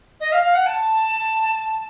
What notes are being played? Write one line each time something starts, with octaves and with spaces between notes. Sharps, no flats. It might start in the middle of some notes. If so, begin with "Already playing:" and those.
D#5
F5
F5
F#5
A5